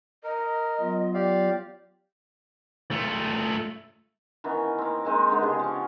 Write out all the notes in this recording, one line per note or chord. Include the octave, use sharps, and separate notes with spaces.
A#4 D#5
F#3 B3 F4
G4 D5 F5
A3 F4
D#3 E3 B3 C#4
A#3 C4
G#3 A#3 C4 D#4
D3 G#3 B3
C#3 G4 G#4
F3 C#4